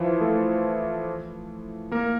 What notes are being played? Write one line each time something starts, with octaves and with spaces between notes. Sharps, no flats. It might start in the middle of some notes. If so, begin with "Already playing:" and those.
Already playing: E3 F3 E4 F4
A3 A4
A#3 A#4